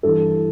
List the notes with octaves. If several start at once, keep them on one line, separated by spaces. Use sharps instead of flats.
G2 E3 A4